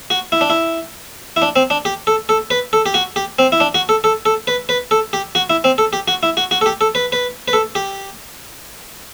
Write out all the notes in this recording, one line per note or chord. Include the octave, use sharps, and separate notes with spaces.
F#4
E4
D4
E4
E4
D4
C4
D4
G4
A4
A4
B4
A4
G4
F#4
G4
C4
E4
D4
F#4
A4
A4
A4
B4
B4
A4
G4
F#4
E4
C4
A4
G4
F#4
E4
F#4
F#4
A4
G4
A4
B4
B4
B4
A4
G4